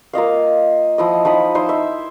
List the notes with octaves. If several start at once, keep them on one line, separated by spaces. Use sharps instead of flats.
A#3 F4 D#5 F5
F3 E4 D#5
F3 D#4 B5 D#6
D#4 E4 C5
E5